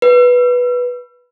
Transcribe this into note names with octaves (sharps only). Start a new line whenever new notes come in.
B4